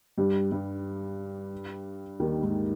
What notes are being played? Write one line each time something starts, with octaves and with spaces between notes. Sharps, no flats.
G2 G3
G2 G3
D#2 D#3
G#2